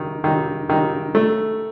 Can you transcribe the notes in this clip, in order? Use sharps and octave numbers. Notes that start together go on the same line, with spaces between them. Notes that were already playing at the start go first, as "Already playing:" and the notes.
Already playing: D#3
D#3
D#3
A3